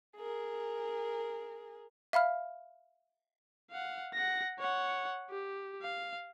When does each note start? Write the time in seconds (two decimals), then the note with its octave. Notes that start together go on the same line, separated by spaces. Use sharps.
0.17 G#4 A#4
2.13 E5 F5 B5 F6
3.71 F5 F#5
4.14 F#5 A#6
4.59 C#5 F#5
5.30 G4
5.82 F5